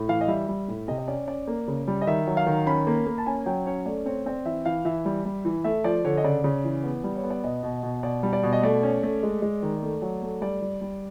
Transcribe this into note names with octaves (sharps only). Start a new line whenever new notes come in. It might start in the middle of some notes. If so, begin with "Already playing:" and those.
Already playing: A2
E3 F5
D#5
G3 E5
G3
A2
C3 D#5
D#5
C#4 D5
C#4 D5
A#3
C#3
G3
D#5
D#3 E5
F#3
F5
D#3
C#4 B5
A#3
A#3
A5
C#4 G#5
F#3 G5
C#4 C#5
A3 D5
C4 C#5
C4 D5
E3 E5
E3 F5
E3 E5
G3
G3
E3
A3 E5
F3 D5
D3 C#5
D#5
C#3 D5
C#3
E3
B3
G3
C#5
B3
D5
B2 D#5
B2
B2
B2 D5
G3
D5
B2
D#5
A3 D5
C#4
A3
G#3
G#3
D#3
A3
F#3
A3
G3 D5
G3
G3